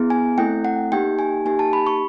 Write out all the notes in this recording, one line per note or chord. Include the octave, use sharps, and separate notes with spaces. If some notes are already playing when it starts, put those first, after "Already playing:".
Already playing: B3 E4 G#4
G#5
A3 C4 E4 A4 G5
F#5
A#3 D#4 G4 G5
G#5
A#3 D#4 G4 G#5
A5
B5
C#6